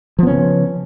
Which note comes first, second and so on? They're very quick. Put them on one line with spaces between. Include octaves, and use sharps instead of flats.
F3 B3 C#4 C#3